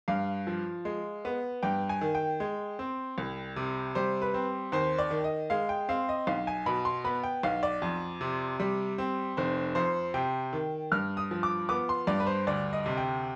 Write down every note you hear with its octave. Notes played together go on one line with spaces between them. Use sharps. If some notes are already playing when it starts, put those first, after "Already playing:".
G2 F5
F3
G#3
B3
G2 G5
G#5
D#3
G5
G#3
C4
C2
C3
G3 C5
B4
C4
D#2 C5
D5
D#3
D#5
G#3 F5
G5
C4 F5
D#5
B1 F5
G#5
B2 B5
C6
B3 B5
G5
B1 F5
D5
F2
C3
G3
C4
F1 C5
F2 C5
C3 G5
D#3
G2 F6
D#6
F3
D6
B3 D6
C6
G2 D5
B4
C5
D2 D5
D#5
C3
G5